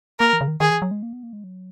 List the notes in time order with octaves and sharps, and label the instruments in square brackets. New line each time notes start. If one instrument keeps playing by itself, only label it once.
[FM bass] A#3 [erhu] A#4
[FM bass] E3
C#3
D#3
[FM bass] D#3 [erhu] G#4
[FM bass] E3
F#3
G#3
A#3
B3
A#3
G#3
F#3